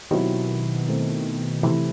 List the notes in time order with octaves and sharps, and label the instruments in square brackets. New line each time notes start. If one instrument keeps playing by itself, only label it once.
[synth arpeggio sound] B2 D#3 [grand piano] F#3 C4 E4 G4
[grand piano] A3 C4 E4
[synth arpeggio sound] C3 E3 [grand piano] A3 E4 G4